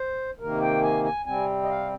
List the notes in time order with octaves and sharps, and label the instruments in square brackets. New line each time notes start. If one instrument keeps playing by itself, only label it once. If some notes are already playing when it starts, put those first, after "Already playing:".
Already playing: [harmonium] C5
C3 D#3 A#3 A#4
G5
G#5
G#5
C3 G3 C4 G#5
D#5
F5